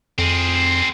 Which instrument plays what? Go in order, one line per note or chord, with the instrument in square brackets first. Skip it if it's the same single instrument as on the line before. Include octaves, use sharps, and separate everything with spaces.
[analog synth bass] F2 [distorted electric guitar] C4 G#4